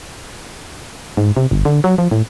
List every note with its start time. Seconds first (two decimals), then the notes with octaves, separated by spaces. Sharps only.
1.17 G#2
1.37 C3
1.51 G1
1.65 D3
1.84 F#3
1.98 F3
2.11 A2